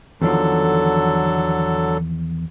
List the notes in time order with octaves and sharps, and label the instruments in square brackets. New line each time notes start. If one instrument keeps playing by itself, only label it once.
[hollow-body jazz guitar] E2 D#3 F3 [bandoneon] D3 F#3 A4